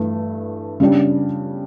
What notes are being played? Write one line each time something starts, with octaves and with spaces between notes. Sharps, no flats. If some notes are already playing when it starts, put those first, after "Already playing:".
Already playing: G2 E3 A3
C#3 G3 D4 G4